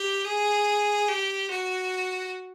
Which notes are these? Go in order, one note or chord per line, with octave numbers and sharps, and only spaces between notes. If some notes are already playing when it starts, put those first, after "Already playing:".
Already playing: G4
G#4
G4
F#4